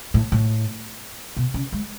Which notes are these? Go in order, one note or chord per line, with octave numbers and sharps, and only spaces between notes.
A2
A2
B2
C#3
G#3